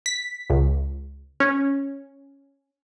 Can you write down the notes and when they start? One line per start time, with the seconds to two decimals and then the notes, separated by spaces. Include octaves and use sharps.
0.06 B6
0.50 C#2
1.40 C#4